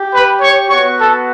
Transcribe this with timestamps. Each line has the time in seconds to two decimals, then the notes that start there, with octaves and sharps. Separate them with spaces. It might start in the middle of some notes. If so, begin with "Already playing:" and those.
Already playing: G4
0.12 B4 B5
0.41 C#5 C#6
0.70 B3 F#4 C#5 C#6
0.98 A4 A5